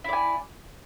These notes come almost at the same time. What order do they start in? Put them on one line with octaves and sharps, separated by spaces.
E4 D5 G#5